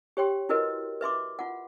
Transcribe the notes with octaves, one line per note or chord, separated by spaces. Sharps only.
G4 C#5 G5 C6
E4 F#4 A#4 B4 D#5
B4 E5 C6 D6
F4 F#5